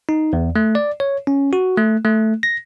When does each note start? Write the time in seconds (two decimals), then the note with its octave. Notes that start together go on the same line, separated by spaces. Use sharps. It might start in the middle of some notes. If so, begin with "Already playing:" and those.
0.09 D#4
0.33 E2
0.56 A3
0.75 D5
1.00 C#5
1.27 C#4
1.53 F#4
1.77 A3
2.04 A3
2.43 A#6